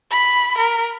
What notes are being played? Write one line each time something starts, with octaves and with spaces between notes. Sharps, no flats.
B5
A#4